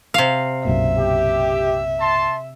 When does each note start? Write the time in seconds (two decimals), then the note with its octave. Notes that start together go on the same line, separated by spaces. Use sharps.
0.14 C3 F5
0.65 B1 F#2 A#2 E5
0.99 G4
2.00 A5 C6